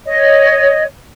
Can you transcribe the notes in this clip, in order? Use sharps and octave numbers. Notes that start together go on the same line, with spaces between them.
C#5 D#5